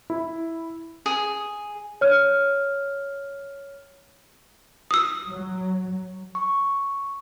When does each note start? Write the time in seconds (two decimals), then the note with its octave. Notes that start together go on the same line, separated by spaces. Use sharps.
0.10 E4
1.06 G#4
2.01 C#5 F6
4.91 D#6 E6
5.28 F#3
6.35 C#6